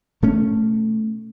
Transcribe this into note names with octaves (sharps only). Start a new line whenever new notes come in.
B2 A3 C#4